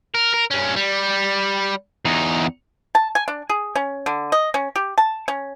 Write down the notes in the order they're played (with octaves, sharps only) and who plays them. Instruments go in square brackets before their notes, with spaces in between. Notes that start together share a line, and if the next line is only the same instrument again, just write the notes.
[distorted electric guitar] A#4
A#4
G2 C#4
G3
E2 D#4
[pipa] A5
G#5
D4
G#4
C#4
D3
D#5
C#4
G4
A5
C#4